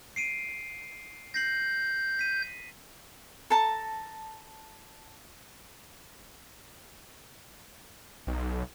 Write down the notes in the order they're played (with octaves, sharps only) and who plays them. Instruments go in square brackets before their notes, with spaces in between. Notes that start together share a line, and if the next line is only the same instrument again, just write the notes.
[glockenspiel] C7 D7 D#7
[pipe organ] G6 [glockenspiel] A#6 C7 F#7
[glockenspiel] B6 D#7
[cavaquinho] A4 A5 A#5
[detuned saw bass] B1